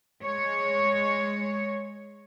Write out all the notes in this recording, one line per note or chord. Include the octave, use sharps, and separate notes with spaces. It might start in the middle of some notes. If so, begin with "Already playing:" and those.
G#3 C#5